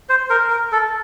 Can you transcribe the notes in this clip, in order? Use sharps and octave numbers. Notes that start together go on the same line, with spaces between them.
C5
A#4
A#4
A4